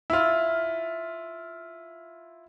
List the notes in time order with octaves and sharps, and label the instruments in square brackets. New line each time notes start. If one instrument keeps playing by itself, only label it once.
[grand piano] E4 F4